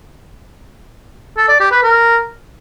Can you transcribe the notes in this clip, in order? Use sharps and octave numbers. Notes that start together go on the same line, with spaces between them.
A4
D5
G4
B4
A#4